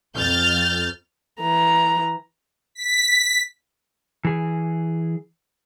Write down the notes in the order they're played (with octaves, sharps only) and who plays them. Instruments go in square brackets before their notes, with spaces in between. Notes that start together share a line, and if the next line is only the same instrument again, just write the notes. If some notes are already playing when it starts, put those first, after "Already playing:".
[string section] F2 F6 G6 A6
[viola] E3 A#5
[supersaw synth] B6
[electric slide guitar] E3 G#4